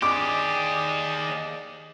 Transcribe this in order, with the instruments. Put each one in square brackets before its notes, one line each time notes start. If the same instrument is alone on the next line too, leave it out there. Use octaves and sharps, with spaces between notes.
[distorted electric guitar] D#2 G4 [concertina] G#4 D5 D#5 [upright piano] D6